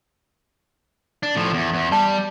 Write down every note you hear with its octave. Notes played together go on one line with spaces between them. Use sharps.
D4
A2 F3
E2
E2
G3 A5